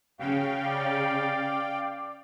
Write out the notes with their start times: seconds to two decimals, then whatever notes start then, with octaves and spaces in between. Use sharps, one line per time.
0.20 C#3 F#4 F5 G5
0.67 D5